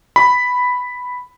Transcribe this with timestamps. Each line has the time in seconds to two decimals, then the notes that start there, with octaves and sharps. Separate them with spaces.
0.16 B5